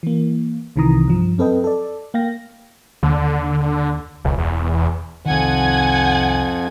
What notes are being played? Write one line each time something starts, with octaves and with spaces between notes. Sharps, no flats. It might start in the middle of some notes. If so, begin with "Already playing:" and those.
E3 A#3
C2 C3 D#3 E3 A#5 D#6
G2 F3
F#2 C4 A4 B4 D#5 G5
A4 D5
A#3 F5 G5 A#6
D#2 D3
E1 C#2
E2
C2 F2 D#3 F#5 G#5 G#6